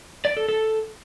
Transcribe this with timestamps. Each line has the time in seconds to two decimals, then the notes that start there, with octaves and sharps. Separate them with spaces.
0.25 D5
0.37 A4
0.49 A4